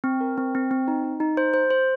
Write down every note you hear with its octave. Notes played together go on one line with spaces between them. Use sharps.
C4
A#4
C4
C4
C4
D#4
D#4
D#4
C5
C5
C5